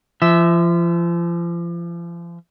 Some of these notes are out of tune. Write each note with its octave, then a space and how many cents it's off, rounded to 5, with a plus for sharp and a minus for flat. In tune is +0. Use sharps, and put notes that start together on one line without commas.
F3 -35 E5 +0